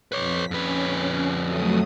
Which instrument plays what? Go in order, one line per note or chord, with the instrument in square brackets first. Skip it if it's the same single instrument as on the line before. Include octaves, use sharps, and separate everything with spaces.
[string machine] F2 B6 [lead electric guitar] B4 C#5
[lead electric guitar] F2 B4 [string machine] C#4
[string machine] F#3 A3 D#6